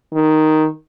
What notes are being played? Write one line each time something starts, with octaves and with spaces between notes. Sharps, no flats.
D#3